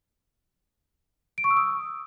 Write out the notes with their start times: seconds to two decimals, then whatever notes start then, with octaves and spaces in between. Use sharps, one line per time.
1.38 D7
1.44 C#6
1.50 E6
1.57 D#6